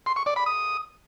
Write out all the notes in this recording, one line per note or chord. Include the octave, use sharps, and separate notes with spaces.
C6
C#6
D5
B5
D#6